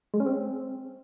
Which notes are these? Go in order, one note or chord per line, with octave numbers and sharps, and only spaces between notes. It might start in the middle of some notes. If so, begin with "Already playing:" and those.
G#3
C#4
C4